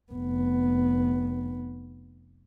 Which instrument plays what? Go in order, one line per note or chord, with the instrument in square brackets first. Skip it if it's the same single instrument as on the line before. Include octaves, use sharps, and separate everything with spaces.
[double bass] F1 B3